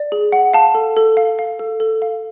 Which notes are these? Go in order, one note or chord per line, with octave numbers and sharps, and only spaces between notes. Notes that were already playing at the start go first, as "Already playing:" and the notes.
Already playing: D5
G#4
F#5
F5 A5
A4
A4
F5
F5
A4
A4
F5